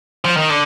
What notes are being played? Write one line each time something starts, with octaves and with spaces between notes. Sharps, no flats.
F3
D#3
D3